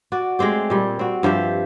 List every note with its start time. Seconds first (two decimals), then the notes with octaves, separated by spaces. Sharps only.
0.12 F#4 D5
0.39 G#3 A3 C4 G4
0.70 A#2 G3
0.99 C4 F#4
1.23 G2 F3 G4 E5